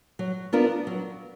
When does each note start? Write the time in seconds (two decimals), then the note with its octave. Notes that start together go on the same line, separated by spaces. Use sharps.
0.19 F#3
0.53 B3 D4 F4 A#4
0.87 F#3